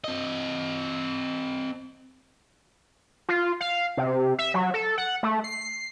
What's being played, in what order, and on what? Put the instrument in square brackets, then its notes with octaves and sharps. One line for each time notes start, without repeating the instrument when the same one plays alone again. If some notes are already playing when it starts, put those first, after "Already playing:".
[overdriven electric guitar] C4 D#5
[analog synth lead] F4
F5
C3
E5
F#3
A4
F#5
A3
C7